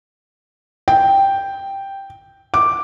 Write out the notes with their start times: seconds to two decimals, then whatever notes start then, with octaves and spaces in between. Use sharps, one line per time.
0.88 G5
2.54 D6